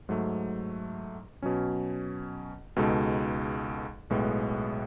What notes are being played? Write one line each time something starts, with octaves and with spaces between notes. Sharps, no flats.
G#2 F#3 A3
B2 F#3 C#4
C#2 B2 G#3 D#4 A4
B1 A2 G#3 B3